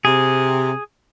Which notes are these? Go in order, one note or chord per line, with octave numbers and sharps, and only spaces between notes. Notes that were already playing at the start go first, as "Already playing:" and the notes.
C3 G#4